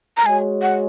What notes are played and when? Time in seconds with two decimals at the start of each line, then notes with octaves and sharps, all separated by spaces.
0.17 A#5
0.25 G#3 F#4 C#5 G#5
0.62 F#5